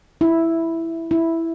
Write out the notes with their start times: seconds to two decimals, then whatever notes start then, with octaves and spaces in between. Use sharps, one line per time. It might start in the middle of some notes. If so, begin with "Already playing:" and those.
0.21 E4
1.11 E4